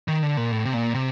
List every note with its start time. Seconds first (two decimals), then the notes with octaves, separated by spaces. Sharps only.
0.08 D#3
0.23 D3
0.37 A#2
0.51 A2
0.65 C3
0.74 A#2
0.94 C3